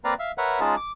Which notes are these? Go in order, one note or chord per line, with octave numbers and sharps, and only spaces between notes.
A#3 C4 B4 D5 F5 A#5
E5 F5
A#4 B4 C#5 E5 F#5
G#3 C#4 D#4 F4 G#4 A5
D6